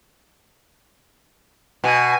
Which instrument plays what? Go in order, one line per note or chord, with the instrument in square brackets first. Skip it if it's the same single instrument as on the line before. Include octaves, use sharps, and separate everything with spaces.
[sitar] B2 [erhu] G#5